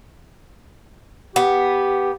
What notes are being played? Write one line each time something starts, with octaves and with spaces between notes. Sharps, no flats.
B3 G4